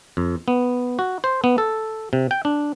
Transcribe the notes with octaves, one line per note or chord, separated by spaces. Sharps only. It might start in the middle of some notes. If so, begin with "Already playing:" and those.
F2
B3
F#4
C5
B3
A4
C3
G5
D4